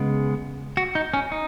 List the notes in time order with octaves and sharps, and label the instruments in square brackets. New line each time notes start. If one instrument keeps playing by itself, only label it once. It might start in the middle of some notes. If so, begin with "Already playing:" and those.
Already playing: [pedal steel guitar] C#3 G#3 B3
F#4
D#4
C#4
D#4